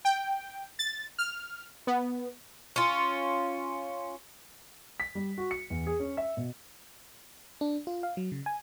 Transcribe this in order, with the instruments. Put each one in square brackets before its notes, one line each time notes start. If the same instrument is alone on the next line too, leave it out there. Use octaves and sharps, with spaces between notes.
[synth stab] G5
A6
F6
B3
[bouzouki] C#4 F4
[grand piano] B6
G3
F#4
C#7
E2
G#4
C#4
E5
B2
[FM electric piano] D4
F4
F5
F#3
C#3
G#5